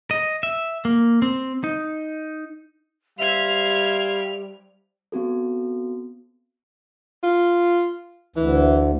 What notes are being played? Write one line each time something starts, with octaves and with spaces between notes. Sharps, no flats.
D#5
E5
A#3
C4
D#4
G3 C5 E5 F5 G#6 F7
B3 C4 F#4 A4
F4
D2 E3